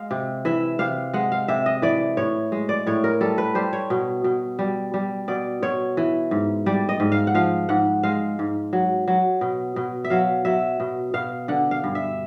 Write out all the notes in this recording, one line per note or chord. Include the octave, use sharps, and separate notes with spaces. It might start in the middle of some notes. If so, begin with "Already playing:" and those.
Already playing: G#3 F5
C3
E3 E5
C3 F5
G#3 F#5
F5
C3 E5
D#5
E3 D5
A2 C#5
G#3
D5
A2 C#5
A#4
G3 A4
B4
G3 C5
C#5
B2
B2
G3
G3
B2 D5
B2 C#5
E3
G#2
G3 D5
D#5
G#2
F5
F#5
F3 F5
G#2 F#5
G#3 F5
G#2
F#3
F#3
B2
B2
E5
F#3 F5
F#3 E5
B2
B2 F5
D3 F#5
F5
G2
E5